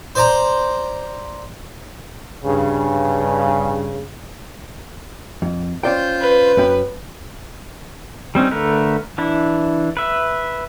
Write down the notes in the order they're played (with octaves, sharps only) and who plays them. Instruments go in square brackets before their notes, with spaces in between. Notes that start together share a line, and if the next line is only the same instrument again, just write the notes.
[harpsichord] C5 D5 A#5
[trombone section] G2 C#3
[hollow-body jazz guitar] F2
[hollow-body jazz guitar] C#4 D5 G5 [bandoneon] F4 C5 G6
[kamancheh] B4
[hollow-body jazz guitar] F#2 C#4 G5
[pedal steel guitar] G3 C4 C#4 D#4
D3 A3 A#4 B4
E3 D4 E4
B4 E5